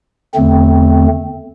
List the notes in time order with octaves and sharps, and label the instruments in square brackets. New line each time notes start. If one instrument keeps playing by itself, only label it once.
[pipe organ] E2 D3 A3 C4